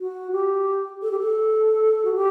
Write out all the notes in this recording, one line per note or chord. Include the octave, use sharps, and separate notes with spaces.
F#4
G4
A4
G4
A4
F#4
G4